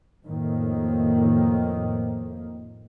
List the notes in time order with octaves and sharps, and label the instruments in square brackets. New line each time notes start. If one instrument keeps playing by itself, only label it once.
[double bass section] F2 A2 D#3 A#3